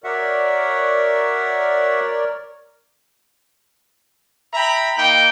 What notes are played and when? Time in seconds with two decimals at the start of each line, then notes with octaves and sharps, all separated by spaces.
0.04 F#4 A#4 C#5 D5 E5 F#5
4.53 E5 G5 A#5 B5
4.96 A#3 D#4 G5